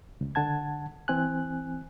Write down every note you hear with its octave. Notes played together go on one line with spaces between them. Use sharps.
C#2
D3 F#5 A5 G#6
E3 C4 G#5 F#6